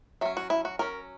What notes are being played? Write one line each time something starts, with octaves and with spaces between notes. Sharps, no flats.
F#3 C#4 E5
F#4
E4
F#4
F#3 C#4 A#4